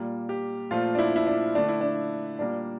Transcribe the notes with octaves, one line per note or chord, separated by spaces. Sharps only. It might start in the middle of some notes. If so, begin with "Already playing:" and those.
Already playing: A#2 G3 A#3
G4
A#2 F3 A3 F4
D4
E4
E4
D4
D3 A3 D4
E4
D4
A#2 G3 A#3 D4